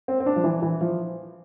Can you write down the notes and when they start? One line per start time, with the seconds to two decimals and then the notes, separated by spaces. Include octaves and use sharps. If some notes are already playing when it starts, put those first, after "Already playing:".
0.08 C4
0.20 C4
0.26 D4
0.36 F3
0.44 E3
0.62 E3
0.81 F3